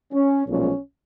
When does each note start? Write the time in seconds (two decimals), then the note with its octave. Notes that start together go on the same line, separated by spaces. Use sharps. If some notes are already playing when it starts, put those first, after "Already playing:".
0.13 C#4
0.47 B1 A#2 F3 G#3 C#4